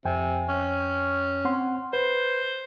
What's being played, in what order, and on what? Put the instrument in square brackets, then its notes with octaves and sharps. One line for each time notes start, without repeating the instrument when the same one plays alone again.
[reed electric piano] F2 G5 G#5 [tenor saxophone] C3
[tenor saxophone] C#4
[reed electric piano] C4 F#5 C6
[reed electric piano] B4 [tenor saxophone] C5